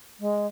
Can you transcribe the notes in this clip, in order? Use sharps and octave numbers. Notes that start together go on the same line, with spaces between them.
G#3